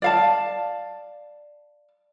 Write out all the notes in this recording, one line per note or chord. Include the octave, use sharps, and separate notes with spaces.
D5 F5 A5